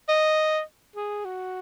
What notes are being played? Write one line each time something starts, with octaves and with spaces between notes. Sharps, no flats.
D#5
G#4
F#4